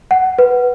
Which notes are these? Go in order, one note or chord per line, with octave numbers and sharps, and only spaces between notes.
F#5
B4